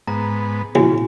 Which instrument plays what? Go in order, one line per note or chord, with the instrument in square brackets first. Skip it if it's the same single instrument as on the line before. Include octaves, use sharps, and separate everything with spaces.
[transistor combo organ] G#2 B3 [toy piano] A#5
[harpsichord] A#1 [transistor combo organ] C#3 [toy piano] E4 F#4 G#5